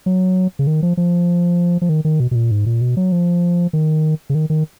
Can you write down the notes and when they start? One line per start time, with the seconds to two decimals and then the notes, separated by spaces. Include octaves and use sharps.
0.06 F#3
0.59 C#3
0.67 D#3
0.83 F3
0.97 F3
1.82 F3
1.89 D#3
2.05 D#3
2.20 B2
2.31 B2
2.35 A#2
2.51 G#2
2.66 A#2
2.81 B2
2.97 F#3
3.12 F3
3.73 D#3
4.30 C#3
4.35 D#3
4.50 D#3